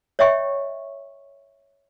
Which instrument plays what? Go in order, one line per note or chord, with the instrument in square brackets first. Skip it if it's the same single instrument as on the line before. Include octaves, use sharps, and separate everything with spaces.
[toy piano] C#5 D#5 E5 G5 C#6